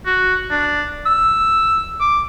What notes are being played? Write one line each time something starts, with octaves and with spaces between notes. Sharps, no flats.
F#4
D4
E6
D6